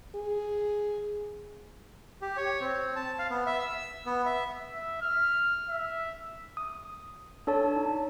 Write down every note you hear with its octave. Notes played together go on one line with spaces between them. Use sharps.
G#4
G4
C#5
C4
A5
F5
B3
E5
E6
B3
E5
E5
F6
E5
D#6
D4 A4 C#5 A5
D#4